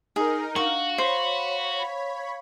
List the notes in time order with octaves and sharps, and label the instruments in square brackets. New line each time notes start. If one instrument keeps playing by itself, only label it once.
[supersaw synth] D#4 A#4 [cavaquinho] G#4
[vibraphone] D4 F5 F#5 [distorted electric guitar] F#4 [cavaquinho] C#6
[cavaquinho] C5 [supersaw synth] C#5 B5 [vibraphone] F5